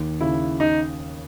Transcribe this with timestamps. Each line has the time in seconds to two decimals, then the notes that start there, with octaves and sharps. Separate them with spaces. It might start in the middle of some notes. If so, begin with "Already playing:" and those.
Already playing: D#2
0.21 C#3 E4
0.60 D#4